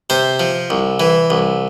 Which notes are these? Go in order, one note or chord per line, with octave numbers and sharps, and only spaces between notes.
C3 C5
F3
C2
E3
C2